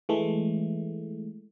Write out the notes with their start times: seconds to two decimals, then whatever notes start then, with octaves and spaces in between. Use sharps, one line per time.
0.09 E3 G#3 A3